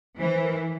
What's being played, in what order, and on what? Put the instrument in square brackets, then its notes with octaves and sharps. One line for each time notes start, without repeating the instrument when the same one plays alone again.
[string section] E3 [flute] C5
[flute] A#4